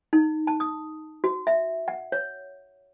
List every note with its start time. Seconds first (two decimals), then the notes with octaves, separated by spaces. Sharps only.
0.13 D#4
0.47 A5
0.60 D#6
1.24 F#4
1.47 E5
1.88 F#5
2.12 C#5